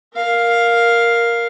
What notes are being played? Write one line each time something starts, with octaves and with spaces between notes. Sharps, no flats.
A#4 F5